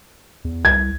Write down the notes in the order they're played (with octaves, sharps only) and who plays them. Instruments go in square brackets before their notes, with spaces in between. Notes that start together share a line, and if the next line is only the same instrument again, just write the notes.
[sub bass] E2
[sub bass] C2 [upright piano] G#6